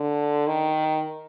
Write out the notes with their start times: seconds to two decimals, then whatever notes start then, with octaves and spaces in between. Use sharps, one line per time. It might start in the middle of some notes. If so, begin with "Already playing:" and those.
Already playing: D3
0.47 D#3